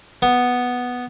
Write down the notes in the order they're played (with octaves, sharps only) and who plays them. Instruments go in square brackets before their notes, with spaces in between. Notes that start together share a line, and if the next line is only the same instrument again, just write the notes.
[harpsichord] B3